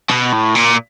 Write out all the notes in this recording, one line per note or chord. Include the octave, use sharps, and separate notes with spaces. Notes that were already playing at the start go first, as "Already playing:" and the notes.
B2
A2
A#2